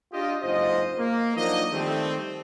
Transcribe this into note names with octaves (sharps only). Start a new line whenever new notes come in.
D4 F4 G4 D#5
F#1 G#2 F4 C5 D#5
A#3
F3 F#3 D4 D#4 A#4 D#5
D#3 G3 A3 C4